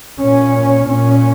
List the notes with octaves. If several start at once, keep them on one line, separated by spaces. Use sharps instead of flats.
A#2 C#4
A#2 C#4